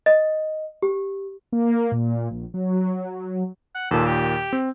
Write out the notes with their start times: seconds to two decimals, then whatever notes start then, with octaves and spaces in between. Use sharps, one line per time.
0.06 D#5
0.82 G4
1.52 A#3
1.92 A#2
2.31 A#1
2.54 F#3
3.75 F#5
3.91 D#2 A#2 A4
4.06 G4
4.53 C4